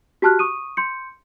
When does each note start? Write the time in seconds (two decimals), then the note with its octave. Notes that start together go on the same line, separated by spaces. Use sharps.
0.22 F#4 G4 A5 F6 F#6
0.39 C#6 D#6 D#7
0.77 C6 G6 C#7